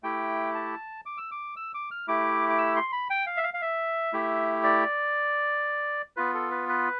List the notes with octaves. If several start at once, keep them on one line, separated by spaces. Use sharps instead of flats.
A3 E4 G4 G5
A5
D6
E6
D6
E6
D6
F6
A3 E4 G4 D6
D6
E6
C6
B5
G5
F5
E5
F5
F5
E5
A3 E4 G4
D5
B3 F4 B4
A4
B4
B4